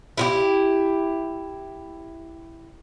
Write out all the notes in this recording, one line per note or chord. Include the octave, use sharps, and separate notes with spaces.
E4 F4 G4